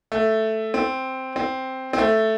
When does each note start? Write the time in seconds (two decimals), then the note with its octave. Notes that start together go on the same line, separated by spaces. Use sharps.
0.12 A3
0.74 C4
1.36 C4
1.93 C4
1.98 A3